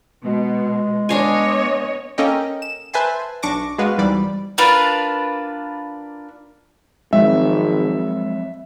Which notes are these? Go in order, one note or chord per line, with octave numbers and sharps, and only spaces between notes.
B2 G#3
B3 D4 C#5 D#5 F5 G#5
A#3 C#4 A4 A#4 D#5 G5
E7
B4 C5 E5 G#5 A5 C6
B1 D4 C#6 D6 A#6
G#3 B3 F#4 B4 F5
C2 G#2 E3 G3 D5 B5
A#3 D4 F4 B4
G#1 F3 F#3 G#3 C4 E5